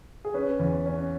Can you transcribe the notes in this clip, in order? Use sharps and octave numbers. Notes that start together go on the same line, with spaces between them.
G#4
C#4 B4
E2
C#4